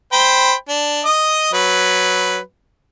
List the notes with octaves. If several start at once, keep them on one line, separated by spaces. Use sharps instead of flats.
C5 G5 B5
D4
D#5 D#6
F#3 B4